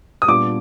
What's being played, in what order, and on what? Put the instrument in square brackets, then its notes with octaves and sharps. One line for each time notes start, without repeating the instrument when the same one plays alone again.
[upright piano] D#6
[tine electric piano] A#2 G3 B3 D4 F4 [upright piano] D6